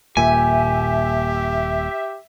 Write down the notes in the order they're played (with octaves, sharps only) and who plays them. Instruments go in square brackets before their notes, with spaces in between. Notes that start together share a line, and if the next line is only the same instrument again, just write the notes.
[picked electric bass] D#1 A#2 [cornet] G4 [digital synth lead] E5 [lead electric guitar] G#5